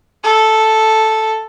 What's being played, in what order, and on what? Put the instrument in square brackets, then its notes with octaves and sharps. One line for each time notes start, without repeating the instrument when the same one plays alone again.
[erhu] A4